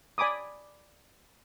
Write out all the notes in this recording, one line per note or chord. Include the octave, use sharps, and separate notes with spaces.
D5 G#5 B5 D6 D#6